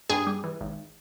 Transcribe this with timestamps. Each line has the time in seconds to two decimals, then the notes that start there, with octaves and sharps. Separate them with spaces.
0.10 G2 G#4
0.27 G3
0.44 E3
0.61 G#1